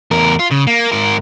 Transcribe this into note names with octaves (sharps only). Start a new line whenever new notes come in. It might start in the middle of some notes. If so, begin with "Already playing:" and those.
E2 A#4
F4
C#3
A#3
G#2 A#4